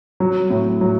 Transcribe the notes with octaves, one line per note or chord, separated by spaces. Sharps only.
F#3
A2
F#3